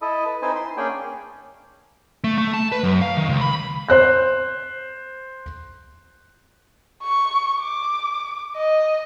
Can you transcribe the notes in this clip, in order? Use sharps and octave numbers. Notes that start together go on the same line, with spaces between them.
E4 A4 D#5
B4
C4 D#4 E4 B4 C5 G#5
C6
A#3 C#4 D4 G#4 G5
A3
A3
A5
B4
F#2
F5
D#3
C#2
B5
C5 F#6 G6
C#6
D6
D#5